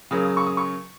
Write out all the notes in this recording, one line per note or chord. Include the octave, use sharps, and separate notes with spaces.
C#3 F#3 A#3 D#6
D#6
C#6
D#6
C#6